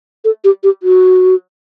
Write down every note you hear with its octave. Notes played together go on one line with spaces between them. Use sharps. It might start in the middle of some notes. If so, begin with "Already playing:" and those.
A4
G4
G4
F#4